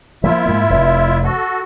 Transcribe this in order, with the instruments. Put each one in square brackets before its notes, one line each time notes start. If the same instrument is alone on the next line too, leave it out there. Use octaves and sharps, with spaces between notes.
[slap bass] F3 A#3 [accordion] E4 F4 E5
[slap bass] G#2 A#3
F1
[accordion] F#4 A4